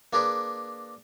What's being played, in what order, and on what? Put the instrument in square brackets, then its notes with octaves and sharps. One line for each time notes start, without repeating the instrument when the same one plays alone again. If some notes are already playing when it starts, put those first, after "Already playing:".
[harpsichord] A#3 D4 G#4 A#4 B4